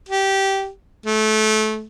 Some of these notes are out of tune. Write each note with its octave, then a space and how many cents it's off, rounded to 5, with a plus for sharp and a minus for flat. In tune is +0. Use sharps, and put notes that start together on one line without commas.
G4 -15
A3 -25